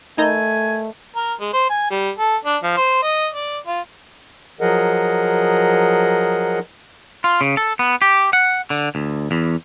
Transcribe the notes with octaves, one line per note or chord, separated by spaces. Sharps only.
A3 D#4 A#4 D#5 G#5 A#5 B5 G6
A#4
G#3
C5
G#5
G3
A4
D4
F3
C5
D#5
D5
F4
F3 F#3 G#4 A#4 D#5 F#5
F4
C#3
A4
B3
G4
F#5
D3
D2
E2